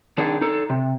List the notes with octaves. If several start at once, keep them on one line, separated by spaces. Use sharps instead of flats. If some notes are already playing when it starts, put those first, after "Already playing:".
D#3 D4 D#4 G#4
D#4 A4
C3